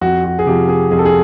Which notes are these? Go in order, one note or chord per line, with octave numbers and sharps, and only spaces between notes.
F2 F#4
F#4
G#4
C3 F3 G4
G#4
F2 G#4
A4
G#4